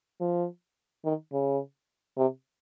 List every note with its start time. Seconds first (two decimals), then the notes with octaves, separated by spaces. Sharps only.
0.21 F3
1.05 D#3
1.33 C#3
2.17 C3